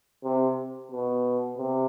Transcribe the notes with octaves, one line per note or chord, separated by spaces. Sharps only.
C3
B2
C3